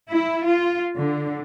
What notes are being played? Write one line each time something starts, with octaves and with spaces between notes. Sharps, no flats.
E4
F4
D3